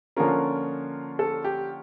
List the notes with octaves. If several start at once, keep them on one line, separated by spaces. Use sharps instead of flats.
D3 F3 A#3 C#4 F4 A#4
A4
G4